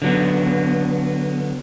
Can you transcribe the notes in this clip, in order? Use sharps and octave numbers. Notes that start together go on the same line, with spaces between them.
D3 F#3 B3